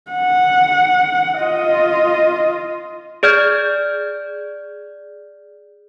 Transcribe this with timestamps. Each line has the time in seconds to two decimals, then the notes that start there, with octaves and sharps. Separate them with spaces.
0.11 F#5
1.39 F4 D#5
3.23 G#4 D5 F6 G6 G#6